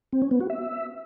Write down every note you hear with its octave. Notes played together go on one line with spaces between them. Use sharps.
C4
C#4
B3
F#4
E5